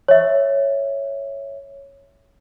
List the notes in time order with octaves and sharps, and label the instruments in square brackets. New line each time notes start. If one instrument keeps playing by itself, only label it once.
[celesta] C#5 E5